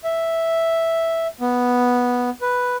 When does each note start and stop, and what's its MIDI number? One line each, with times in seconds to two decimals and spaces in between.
0.04 1.27 76
1.41 2.30 59
2.42 2.76 71